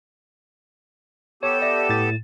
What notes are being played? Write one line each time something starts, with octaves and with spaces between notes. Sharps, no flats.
B3 G4 A4 C#5 E7
D5 E5 A#6
A2 A6